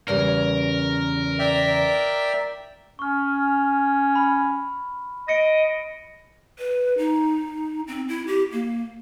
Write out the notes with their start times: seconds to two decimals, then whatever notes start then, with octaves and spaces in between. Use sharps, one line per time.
0.08 E2 C#3 G3 A#4
1.39 D5 E5 G5
2.99 C#4 C#6 F6
4.15 B5
5.28 D#5 A#6 C#7 D7
6.59 B4
6.98 D#4
7.88 C4
8.09 E4
8.27 G4
8.52 A#3